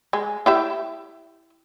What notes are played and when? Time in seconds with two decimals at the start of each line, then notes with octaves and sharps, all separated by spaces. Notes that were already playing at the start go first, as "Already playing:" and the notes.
0.13 G#3
0.46 E4 G4 E5